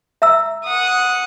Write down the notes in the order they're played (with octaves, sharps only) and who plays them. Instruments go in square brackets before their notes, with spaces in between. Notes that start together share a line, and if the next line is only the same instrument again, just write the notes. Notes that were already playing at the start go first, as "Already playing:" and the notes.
[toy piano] E5 A#5 E6
[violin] F#5 D#6